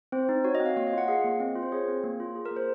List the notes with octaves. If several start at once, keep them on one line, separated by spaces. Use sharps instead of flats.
C4 C5
D#4
F#4 C#5
D#5
C4
F5
A#3 C#5
D#5
F4 F#5
G#4 F5
A#3
C4 D#5
F4
C5
G#4 C#5
C4
A#3
F4
G#4
A#4
A#3
C5